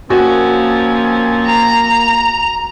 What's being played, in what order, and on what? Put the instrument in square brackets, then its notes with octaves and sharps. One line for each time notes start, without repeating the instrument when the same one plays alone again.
[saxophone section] F3 C4 C#4 [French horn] A#3 [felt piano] F#4
[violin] A#5